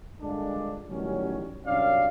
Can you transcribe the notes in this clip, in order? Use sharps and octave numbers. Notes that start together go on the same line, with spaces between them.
G2 A#2 D3 G#3 D4
A1 D#3 F#3 G3 C#4
C2 F#2 C#4 D4 D5 F5